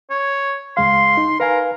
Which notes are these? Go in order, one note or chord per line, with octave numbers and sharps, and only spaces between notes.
C#5
C#2 G#3 F5 C6
D#4
A#4 B4 F5 G#5